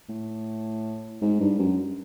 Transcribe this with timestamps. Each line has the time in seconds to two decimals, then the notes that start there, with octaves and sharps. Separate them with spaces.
0.09 A2
1.21 G#2
1.40 G2
1.59 F#2